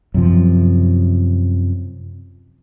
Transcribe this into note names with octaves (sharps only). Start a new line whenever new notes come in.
F#2 C3 F3